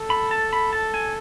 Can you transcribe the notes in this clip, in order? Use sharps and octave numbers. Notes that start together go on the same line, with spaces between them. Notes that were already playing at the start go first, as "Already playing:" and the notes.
Already playing: A4
B5
A5
B5
A5
G#5